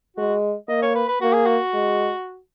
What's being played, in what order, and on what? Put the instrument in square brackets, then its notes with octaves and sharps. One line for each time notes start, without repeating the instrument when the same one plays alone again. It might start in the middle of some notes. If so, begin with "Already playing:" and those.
[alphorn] G#3 [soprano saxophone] F#4
[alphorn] A#3 [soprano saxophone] D#5
[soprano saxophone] C#5
B4
B4
[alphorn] A#3 [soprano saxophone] F#4
[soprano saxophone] G#4
F#4
[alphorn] G#3